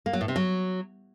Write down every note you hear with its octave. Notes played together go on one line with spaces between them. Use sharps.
A#3
F#3
A2
C3
F#3